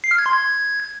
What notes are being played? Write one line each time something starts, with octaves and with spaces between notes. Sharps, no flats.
C7
F6
G#6
C6
G#6